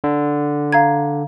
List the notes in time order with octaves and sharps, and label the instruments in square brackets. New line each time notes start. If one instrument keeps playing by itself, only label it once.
[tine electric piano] D3
[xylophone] F5 A#5 G#6